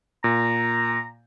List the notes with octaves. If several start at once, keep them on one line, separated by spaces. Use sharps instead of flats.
A#2 A#5